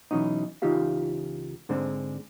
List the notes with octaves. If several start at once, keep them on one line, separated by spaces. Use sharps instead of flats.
B2 E3 F#3 C#4 D#4
C#2 E3 D#4 F4 G4 F5
G#2 D3 G#3 C4 D4